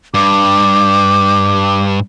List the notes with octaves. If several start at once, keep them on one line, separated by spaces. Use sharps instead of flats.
G2 D6